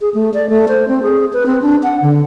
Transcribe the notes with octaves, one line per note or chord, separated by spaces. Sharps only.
G#4
A3
D5
A3
C5
C4
G#4
B4
C4
D4
F#5
D3